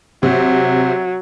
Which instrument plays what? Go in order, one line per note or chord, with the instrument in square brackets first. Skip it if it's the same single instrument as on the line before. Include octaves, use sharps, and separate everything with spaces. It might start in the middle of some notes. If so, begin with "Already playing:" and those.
[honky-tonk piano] C3 [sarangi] F#3